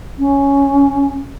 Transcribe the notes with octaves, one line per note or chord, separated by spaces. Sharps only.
C#4